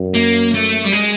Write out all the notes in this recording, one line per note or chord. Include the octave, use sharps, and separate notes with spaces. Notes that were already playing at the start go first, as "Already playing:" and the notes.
Already playing: F#2
A#3
A3
G3
G#3